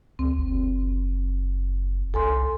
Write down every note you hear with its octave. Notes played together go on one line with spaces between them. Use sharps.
C#2 C4
F#1
C2 A4 G#5 C6